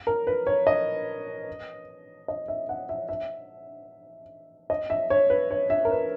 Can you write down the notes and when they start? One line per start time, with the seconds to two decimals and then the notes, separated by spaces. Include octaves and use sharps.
0.07 A#4
0.27 B4
0.47 C#5
0.67 D#5
2.28 D#5
2.48 E5
2.69 F#5
2.89 E5
3.09 E5
4.70 D#5
4.90 E5
5.10 C#5
5.30 B4
5.51 C#5
5.70 E5
5.85 A#4
5.91 B4